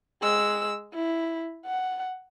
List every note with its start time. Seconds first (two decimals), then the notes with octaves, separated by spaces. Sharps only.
0.22 G#3 E6
0.94 E4
1.66 F#5